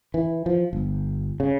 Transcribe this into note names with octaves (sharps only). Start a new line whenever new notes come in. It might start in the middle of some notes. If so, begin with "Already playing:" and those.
E3
F3
G1
C#3